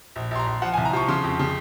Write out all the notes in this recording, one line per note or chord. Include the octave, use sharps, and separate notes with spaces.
A#1
A#1 C6
A#5
A#1
F3 F#5
G#5
C2
A#5
F3 C#6
C#3 C6
F2
C#3